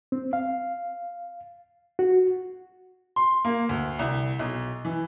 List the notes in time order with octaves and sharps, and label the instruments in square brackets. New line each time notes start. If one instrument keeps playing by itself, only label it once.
[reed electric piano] C4
F5
F#4
[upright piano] C6
A#3
D2
C2
B1
E3